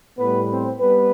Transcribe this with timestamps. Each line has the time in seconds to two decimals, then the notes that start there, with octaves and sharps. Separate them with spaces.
0.18 A2 G3 B3 B4
0.50 C4 C5
0.80 G3 B3 B4